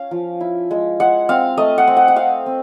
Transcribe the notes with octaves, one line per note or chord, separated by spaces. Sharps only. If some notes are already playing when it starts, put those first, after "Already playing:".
Already playing: C#4 F5
F3
E4
G#3
G#3 F#5
C4 F5
A3 D#5
F#5
C4
F#5
F#5
C4 F5
C4